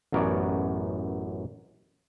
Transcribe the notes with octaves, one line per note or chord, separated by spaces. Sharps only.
A1 F#2 B3 A#4 C#5 D5